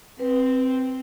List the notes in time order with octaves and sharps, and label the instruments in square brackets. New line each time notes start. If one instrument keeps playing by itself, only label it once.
[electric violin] C4 [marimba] B4